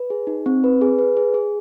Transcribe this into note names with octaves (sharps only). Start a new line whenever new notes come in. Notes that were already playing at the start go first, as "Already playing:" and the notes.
Already playing: B4
G#4
D#4
C4
B4
G#4
B4
G#4
G#4